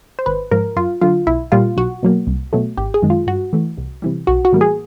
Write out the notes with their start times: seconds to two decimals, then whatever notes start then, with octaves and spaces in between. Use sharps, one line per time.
0.19 C5
0.26 G#1 B4
0.51 G#2 F3 A#4
0.76 F#2 F4
1.02 D3 F#3 F4
1.27 B1 E4
1.52 A#2 G3 A#3 F4
1.77 B1 F#4
2.03 B2 F#3 A#3
2.27 C2
2.53 B2 F#3 A3
2.77 G#1 G4
2.94 G#4
3.02 F#2 D#3 G#3
3.10 F4
3.27 G2 F#4
3.53 E3 A3
3.77 C2
4.02 C3 E3 G3
4.27 B1 F#4
4.45 F#4
4.52 A2 E3 G3 A#3
4.61 G#4